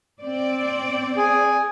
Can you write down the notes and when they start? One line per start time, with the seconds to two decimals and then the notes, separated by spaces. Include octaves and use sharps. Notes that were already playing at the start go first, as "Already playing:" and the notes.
0.20 C4 D5
1.17 G#4